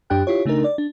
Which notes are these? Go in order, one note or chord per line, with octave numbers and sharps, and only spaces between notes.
F#2 D4 G4 G5 F#6
E4 F4 G4 C#5
C#3 A3 D4 D#4 A#4
D5
D4